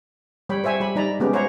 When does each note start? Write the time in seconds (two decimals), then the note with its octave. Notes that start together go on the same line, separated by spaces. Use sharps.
0.49 G3 C#5 G5 B5
0.64 C5 C#5 E5 G#5
0.80 G3 G4 G#5 B5
0.96 G3 D#4 D5 A#5 B5
1.20 G#3 B3 C#4 G4
1.33 C5 C#5 E5 F#5 A#5